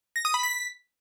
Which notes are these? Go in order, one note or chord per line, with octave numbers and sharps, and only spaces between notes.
A#6
D#6
B5
B6